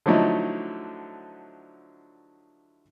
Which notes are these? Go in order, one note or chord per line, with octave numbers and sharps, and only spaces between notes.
D3 F3 F#3 A3 D#4 E4